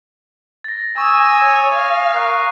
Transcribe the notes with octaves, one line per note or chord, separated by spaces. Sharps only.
A6 A#6
G#5 C#6 D#6 E6
C#5
F5
A#4 C#6 F#6 C7